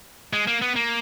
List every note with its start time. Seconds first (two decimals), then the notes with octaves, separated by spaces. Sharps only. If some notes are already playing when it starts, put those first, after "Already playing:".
0.33 G#3
0.47 A#3
0.62 B3
0.76 A#3